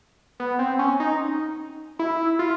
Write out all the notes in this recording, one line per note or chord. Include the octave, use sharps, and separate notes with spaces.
B3
C4
C#4
D#4
E4
F4